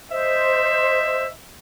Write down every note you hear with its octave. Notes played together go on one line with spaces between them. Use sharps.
C5 D#5 E5